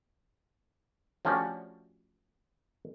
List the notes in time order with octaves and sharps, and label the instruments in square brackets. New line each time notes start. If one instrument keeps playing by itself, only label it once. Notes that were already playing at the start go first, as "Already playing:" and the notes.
[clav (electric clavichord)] F3 A3 C#4 D4 F#4 G4